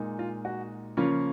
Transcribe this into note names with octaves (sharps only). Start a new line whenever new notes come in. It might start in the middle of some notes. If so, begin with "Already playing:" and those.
Already playing: A#2 G#3 D#4
F4
F#4
C#3 F3 A#3 C#4 F4